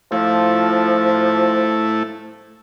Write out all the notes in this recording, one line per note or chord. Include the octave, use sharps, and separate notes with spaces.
F3 A3 E4